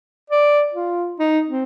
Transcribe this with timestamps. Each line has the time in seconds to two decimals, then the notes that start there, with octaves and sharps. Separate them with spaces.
0.30 D5
0.74 F4
1.20 D#4
1.49 C4